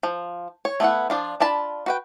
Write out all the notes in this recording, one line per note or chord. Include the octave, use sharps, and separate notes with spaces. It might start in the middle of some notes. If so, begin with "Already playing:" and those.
F3
C#5
A3 B3 E4 F#5
F3 D4 F4
D4 F4 A5 B5
F#4 B4 G5